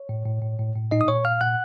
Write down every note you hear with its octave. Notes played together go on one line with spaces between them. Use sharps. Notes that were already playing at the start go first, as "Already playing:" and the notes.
Already playing: C#5
A2
A2
A2
A2
A2
A#2 D#4 D#5
D#6
A#2 C#5 C#6
A#2 F5 F6
A#2 F#5 F#6